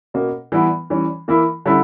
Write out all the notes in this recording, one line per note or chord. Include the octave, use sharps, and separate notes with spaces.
B2 A#3 C#4
E3 G3 B3 E4
E3 G3 C#4
E3 A#3 E4
D3 G3 C#4 E4